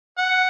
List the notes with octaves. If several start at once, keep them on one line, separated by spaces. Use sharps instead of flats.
F#5